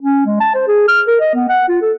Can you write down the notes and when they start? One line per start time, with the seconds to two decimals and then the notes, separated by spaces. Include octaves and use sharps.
0.01 C#4
0.26 G#3
0.40 A5
0.55 C5
0.67 G#4
0.88 F6
1.08 A#4
1.20 D#5
1.34 B3
1.49 F#5
1.69 F4
1.82 A4